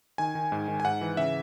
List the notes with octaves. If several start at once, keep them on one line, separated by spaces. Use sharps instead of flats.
D#3 G#5
D#3
G#2
D#3
G#5
G#2 F#5
E3
C#3 E5